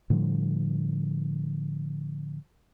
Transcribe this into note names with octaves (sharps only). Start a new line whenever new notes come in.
A2 D3 F3 G3